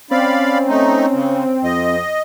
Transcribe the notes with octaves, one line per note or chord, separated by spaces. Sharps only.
C4 C#4 D5 F5 B5
A3 D#4
C#3
F2 D#5